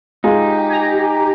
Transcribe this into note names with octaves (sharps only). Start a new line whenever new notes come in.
G#3 D#4 F4 G4
G#5 A#5